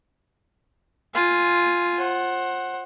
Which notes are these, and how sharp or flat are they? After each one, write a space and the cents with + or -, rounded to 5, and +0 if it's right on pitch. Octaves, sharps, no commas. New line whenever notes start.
F4 +0 G#5 +0
C5 +30 F#5 +0